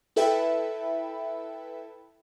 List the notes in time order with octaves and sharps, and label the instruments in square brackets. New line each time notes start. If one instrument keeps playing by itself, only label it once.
[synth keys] E4 A4 B4 E5 G5 B5